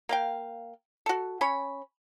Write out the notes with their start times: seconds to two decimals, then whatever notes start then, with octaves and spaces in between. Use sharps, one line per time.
0.09 A#3 F5 G5
1.06 F#4 A4
1.41 C#4 C#5 B5